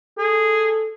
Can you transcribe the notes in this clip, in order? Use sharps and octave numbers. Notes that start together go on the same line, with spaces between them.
G#4 A4